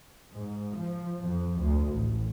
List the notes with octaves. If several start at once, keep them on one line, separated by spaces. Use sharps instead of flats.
G#2
F3
F2
D2
A1